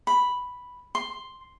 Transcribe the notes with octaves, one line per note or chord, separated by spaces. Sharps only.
B5
C6